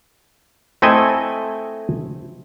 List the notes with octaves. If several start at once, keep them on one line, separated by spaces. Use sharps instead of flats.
A3 C4 E4 A4 D#5 G#5